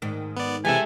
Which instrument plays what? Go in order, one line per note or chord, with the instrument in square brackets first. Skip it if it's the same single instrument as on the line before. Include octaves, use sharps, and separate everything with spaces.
[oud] G#2 D#3
[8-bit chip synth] B3 D5
[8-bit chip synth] C3 E3 [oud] G#3 [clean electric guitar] G4 A4 E5 [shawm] G#5